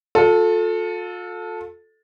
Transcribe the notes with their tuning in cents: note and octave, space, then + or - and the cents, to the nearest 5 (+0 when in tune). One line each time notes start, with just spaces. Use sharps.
F4 +40 A4 +0